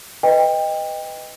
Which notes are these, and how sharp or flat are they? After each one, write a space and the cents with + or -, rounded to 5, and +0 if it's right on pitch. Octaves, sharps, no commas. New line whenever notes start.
B4 +10 D#5 +0 G5 +25